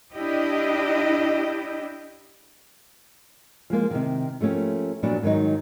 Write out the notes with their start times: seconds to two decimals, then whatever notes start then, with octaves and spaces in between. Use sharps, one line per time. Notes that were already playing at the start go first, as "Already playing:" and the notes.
0.13 D4 E4 G4 D#5
3.70 F3 G#3 A#3 F4
3.91 C3 D#3
4.41 F3 A3 A#3 C#4 G4
5.03 A#2 F3 F#3 B3 D4 F#4
5.22 G#2 D#3 E3 F#3 D#4